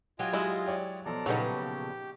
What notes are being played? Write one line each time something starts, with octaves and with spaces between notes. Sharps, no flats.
F#3 F4 G4 D#5 G#5
G#3 E4 C6 E6
C#5 D5 G5
B2 F3 A4 D5 A#5
A#2 C#3 F#3 B3 D#4 G4